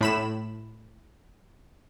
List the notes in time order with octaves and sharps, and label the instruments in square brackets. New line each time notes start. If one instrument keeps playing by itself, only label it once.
[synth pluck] A2 B5 E7